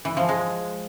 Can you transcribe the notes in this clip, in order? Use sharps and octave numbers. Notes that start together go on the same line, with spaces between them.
E3
F3
G#3